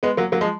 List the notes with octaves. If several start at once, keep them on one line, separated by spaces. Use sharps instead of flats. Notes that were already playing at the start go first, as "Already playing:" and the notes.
G#3 B3
F#3 A#3
F#3 A#3
F3 G#3